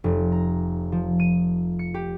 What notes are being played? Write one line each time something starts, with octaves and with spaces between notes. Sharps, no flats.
F1
A#5
F3
D#7
C#7
G4